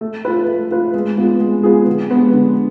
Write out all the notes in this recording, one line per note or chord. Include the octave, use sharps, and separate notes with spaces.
A3
F4 B4
A3
F4 B4
G#3
B3 F4 G#4
G#3
B3 F4 G#4
D3
G#3 B3
D3